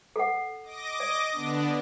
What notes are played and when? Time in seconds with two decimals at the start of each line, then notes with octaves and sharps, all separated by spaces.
0.16 A4 F#5
0.64 D#5 D6 A#6
1.00 D5
1.32 D3 B3 D4